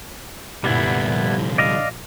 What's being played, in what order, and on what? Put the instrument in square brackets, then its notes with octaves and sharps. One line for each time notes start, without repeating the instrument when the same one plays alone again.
[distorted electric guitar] C2 D3 [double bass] F#2 A#2 [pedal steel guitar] G3 B3 E4
[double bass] A#2 F3
[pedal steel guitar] D5 D#5 F5